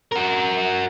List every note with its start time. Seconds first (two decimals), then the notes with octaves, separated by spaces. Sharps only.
0.12 F#4 A#4